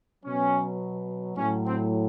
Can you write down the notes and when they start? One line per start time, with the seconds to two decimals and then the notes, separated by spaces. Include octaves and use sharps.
0.24 B2 F#3 C#4
1.36 A2 F#3 C#4
1.65 C4